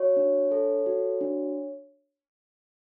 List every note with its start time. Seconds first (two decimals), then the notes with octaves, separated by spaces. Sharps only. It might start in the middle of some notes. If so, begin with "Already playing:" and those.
Already playing: F#4 C#5
0.17 D4
0.51 A4
0.86 F#4
1.21 D4